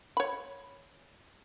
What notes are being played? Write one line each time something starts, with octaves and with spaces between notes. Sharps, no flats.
C#5 B5